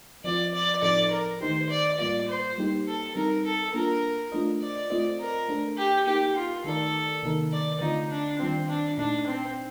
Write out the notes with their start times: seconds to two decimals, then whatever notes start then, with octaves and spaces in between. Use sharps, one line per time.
0.24 F3 C4 F4 D5
0.54 D5
0.82 A2 F3 C4 D#4 A4 D5
1.11 A#4
1.41 D#3 A3 D#4 G4 C5
1.70 D5
1.99 A2 G3 A#3 F4 D5
2.28 C5
2.58 G3 A#3 D#4 G4
2.87 A4
3.15 G3 C4 D#4 A#4
3.45 A4
3.74 A#3 D4 F4 A#4
4.32 A3 D4 F4 C5 D#5
4.61 D5
4.90 A3 C4 F4 C5 D#5
5.19 A#4
5.49 A3 D4 A4
5.77 G4
6.07 A#3 D#4 G4 A#4
6.36 F4
6.64 D#3 A3 D#4 A4 A#4 D5
7.23 C3 D#3 A#3 D#4 A#4
7.52 D5
7.81 D3 A3 C4 D#4 F4
8.10 D4
8.39 D#3 G3 C4 D4 F4
8.68 D4
8.98 A#2 A3 D4 D#4
9.27 C4